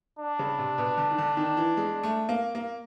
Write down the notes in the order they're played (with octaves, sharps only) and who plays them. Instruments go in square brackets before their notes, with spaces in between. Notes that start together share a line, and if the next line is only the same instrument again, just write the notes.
[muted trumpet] D4
[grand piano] C#3
C3
B2
D3
D#3
D3
D#3
E3
G#3
A3
A#3
A#3